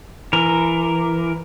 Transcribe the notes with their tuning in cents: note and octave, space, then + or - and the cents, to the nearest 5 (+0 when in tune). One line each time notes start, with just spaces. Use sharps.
E3 +20 A#4 +0